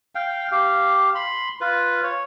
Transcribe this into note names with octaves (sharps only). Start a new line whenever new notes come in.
F5 G5
G4 F5
B5 C6
F4 B4
C#5